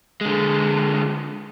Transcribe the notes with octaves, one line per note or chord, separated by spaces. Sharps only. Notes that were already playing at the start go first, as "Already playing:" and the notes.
D3 G#3